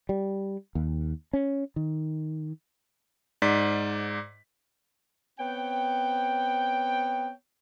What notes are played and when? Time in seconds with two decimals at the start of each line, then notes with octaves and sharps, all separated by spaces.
0.09 G3
0.75 D#2
1.33 C#4
1.76 D#3
3.42 G#2 D5 B6
5.39 B3 C4 C#5 G5